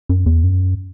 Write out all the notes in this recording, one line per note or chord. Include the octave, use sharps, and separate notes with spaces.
F#2
E2
F#2